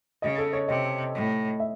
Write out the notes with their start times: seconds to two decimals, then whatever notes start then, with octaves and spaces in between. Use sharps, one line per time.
0.22 C#3 D#5
0.38 A4
0.53 C#5
0.68 C3 D#5
1.14 A2
1.60 E5